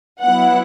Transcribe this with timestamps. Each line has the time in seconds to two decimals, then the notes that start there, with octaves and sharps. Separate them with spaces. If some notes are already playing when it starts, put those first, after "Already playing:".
0.21 F#3 B3 E4 F#5